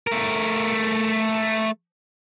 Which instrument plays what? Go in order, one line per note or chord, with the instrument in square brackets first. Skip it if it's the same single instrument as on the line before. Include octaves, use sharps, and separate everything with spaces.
[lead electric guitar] A3 A#4